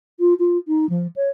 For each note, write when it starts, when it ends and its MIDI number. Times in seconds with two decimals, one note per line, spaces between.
0.20 0.34 65
0.39 0.57 65
0.68 0.88 63
0.89 1.07 53
1.16 1.29 73